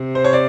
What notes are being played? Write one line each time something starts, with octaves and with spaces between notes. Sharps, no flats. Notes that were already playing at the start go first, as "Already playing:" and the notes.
Already playing: C3
C5
C#5
D5